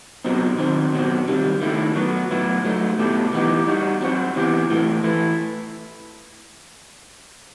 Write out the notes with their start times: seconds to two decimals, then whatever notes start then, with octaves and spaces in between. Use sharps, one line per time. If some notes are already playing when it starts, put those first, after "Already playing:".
0.25 B2 F#3 C4 D#4
0.58 D#3 F#3 C4
0.93 B2 F#3 C4
1.27 C3 D#3 G3
1.62 D#3 A3 E4
1.96 F#3 B3 F#4
2.31 A2 F#3 B3 E4
2.64 F#3 A3 D#4
2.99 B2 A3 E4 G4
3.33 E3 B3 D#4 G4
3.67 G3 D#4 F#4
4.01 F#3 C4 F#4
4.36 C3 E3 B3 E4 G4
4.70 A2 E3 A3 C4
5.04 E3 A3 E4